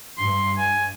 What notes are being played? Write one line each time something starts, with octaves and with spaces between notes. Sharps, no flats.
G2 C6
G#5